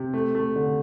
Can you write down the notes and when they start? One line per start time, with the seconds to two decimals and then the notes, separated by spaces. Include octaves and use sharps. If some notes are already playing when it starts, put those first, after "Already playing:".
Already playing: C3
0.14 A3
0.35 A3
0.55 D3